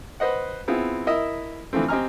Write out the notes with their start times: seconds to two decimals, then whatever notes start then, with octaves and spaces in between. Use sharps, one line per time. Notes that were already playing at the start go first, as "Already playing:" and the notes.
0.20 B4 C5 D#5 F#5
0.68 B3 C4 E4 F4 G#4
1.07 E4 A#4 D#5 E5
1.73 D3 E3 F3 A3 C4
1.89 C4 G4 D#5 G#5 A#5 F6